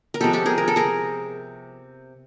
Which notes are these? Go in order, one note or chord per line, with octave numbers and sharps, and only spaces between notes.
A#4
C3 F3 G#3 B3 G4 A4
G4 A4
G#4 A#4
A#4
A4
G#4 A#4